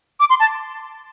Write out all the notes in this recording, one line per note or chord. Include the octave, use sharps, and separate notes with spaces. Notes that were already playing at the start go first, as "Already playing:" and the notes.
D6
C6
A5